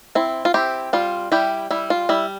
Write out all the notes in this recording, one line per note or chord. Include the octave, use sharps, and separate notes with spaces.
C4 E4
F4
C4 E4 G4
G3 F4
G3 E4 G4
G3 E4
F4
G3 E4